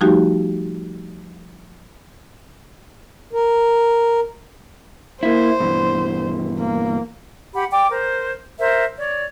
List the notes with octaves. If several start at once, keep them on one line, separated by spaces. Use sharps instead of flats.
F3 G3 A3 D#4 F#4 G4
A#4
A#3 E4 C5
G2 B2 E3
A#3
G4 F#5 B5
D5 G5 D6
A#4 C5
A#4 C5 E5
C#5 D5